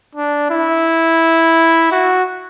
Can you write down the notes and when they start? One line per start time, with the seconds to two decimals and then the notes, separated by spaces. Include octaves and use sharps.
0.15 D4
0.50 E4
1.92 F#4